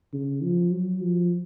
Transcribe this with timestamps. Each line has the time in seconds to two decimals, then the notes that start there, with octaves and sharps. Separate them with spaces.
0.13 C#3
0.43 F3
0.72 F#3
1.01 F3